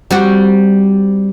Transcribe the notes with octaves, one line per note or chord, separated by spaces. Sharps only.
G3 C4 F#4